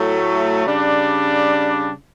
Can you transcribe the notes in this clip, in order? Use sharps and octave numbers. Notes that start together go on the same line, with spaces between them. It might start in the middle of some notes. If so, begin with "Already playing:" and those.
Already playing: A2 F#3 A3
C#3 G3 D4